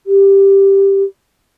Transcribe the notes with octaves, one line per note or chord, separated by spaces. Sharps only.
G4